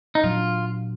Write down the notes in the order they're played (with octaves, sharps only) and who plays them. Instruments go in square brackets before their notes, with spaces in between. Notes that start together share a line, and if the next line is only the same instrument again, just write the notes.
[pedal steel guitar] D#4
[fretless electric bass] A#2 F#3 D4 [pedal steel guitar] F4